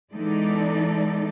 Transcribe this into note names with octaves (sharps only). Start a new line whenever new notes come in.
E3 G#3 B3 D#4 A4 D5